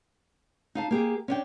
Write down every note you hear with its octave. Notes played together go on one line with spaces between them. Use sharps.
D#4 F5 A5
A#3 G4 G#4
C#4 D4 G5